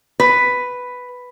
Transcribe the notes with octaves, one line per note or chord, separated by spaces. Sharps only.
B4